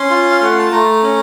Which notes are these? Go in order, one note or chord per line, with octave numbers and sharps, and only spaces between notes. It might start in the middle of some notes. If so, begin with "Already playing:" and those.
Already playing: C#4 C6
F4
F5
A3 F#5
A5
A3 A#5
C#4